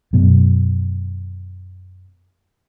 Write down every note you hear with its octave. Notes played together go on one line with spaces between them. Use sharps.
F#2 B2